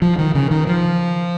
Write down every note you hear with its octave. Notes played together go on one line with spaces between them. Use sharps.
F3
D#3
C#3
D#3
F3